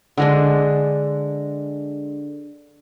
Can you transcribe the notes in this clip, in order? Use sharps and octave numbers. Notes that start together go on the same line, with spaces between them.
D3 G#3 D4